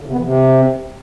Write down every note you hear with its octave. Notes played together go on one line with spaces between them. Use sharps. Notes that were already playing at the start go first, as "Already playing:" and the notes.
D3
C3
B3
E3
C3